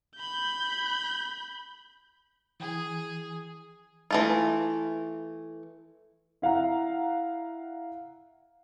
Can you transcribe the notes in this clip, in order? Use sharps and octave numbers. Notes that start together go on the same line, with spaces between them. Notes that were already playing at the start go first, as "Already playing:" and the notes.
B5 G6
E3 G#4
E3 A3 F4
E4 F5 F#5 A#5